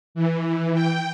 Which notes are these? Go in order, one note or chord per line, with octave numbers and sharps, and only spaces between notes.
E3
G5